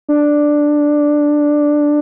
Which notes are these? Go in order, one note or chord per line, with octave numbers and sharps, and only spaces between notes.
D4